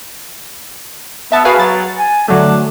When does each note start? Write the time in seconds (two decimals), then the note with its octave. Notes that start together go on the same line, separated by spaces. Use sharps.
1.32 B3 E5 A5
1.45 F#4 G#4 B4 F5
1.59 F#3 A6
1.99 G#5
2.28 D3 F#3 A3 D4